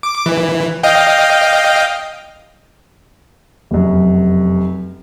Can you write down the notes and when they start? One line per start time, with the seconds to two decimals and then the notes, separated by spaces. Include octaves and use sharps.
0.03 D6
0.26 E3
0.83 D#5 F5 G5
3.71 F1 F#2